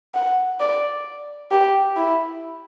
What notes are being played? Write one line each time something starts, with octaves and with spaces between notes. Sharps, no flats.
F#5
D5
G4
E4